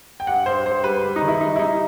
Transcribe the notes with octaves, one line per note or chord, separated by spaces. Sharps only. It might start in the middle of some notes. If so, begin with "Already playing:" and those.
G5
G2 F#5
G2 C5
G2 C5
G3 B4
G3
D#4
D#3
E4
G3 D#4
E4
G3 D#4